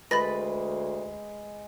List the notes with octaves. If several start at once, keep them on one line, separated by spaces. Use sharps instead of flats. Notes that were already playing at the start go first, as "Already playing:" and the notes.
D2 G#3 B4 B5 A6 A#6